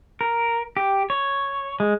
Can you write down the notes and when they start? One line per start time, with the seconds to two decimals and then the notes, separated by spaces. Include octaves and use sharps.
0.21 A#4
0.77 G4
1.10 C#5
1.80 G#3